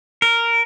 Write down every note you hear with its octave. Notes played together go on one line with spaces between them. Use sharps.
A#4